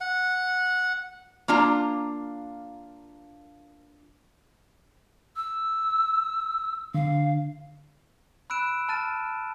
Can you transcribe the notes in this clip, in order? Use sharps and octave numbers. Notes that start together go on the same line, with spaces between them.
F#5
A#3 D4 F4 A#5
E6
D3 F5
B5 E6 F#6 D7 E7
A5 F6 A6 D#7